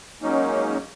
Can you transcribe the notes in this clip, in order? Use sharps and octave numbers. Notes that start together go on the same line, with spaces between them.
F#3 G#3 A#3 C#4 D#4